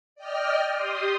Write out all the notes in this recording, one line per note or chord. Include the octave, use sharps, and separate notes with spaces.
D5 D#5 G5 F6
G4 C6 D#6